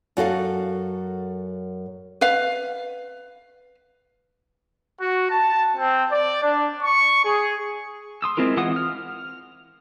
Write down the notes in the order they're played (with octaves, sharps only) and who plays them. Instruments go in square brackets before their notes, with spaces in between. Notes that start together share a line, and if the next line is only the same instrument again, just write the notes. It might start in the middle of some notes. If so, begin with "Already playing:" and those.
[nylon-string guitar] F#2 F#4 A4 F5
[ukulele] B4 F5
[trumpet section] F#4
A5
C4
D5
D4
C#6
G#4
[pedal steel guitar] C6 D#6 E6
G#3 C4 E4 F4 A#4
E3 G#3 F4 F#5 D#6
F6